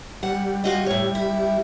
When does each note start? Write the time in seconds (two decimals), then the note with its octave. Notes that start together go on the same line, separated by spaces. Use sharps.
0.23 G3 F#5
0.64 F4 F#4 D#5
0.86 A2 C#5
1.15 E4